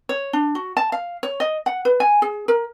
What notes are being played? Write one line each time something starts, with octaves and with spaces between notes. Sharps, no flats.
C#5
D4
F#4
A5
F5
C#5
D#5
F#5
B4
G#5
G#4
A#4